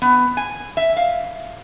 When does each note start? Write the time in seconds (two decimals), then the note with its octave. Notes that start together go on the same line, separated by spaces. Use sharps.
0.02 B3
0.37 G#5
0.77 E5
0.97 F5